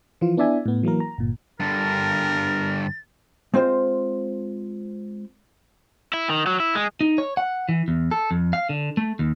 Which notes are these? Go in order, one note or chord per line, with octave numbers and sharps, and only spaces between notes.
E3 F3 F4
B3 D4 E4 D5 E5 G#5
A2 B3
E3 F#3 A#3 A#4
A#5
G1 A#2
G2 D3 A#4 A6
G#3 C4 F4 C5 C6
E4
D#3
F#3
E4
G#3
D#4
C#5
F#5
E3
E2
A4
F2
F5
D3
A3
D#2